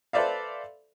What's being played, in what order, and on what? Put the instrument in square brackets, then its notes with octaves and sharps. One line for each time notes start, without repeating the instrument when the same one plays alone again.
[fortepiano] A4 B4 C5 D5 E5 F5